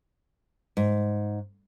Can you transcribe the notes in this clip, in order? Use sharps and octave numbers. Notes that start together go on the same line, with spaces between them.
G#2